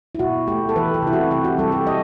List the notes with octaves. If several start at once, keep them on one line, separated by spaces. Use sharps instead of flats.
E4
B2 F#4
A3 G4
A4
E3 B4
G4
C3 E4
F#4
C3 G4
F#4
G3 A4
G4
G3 D#5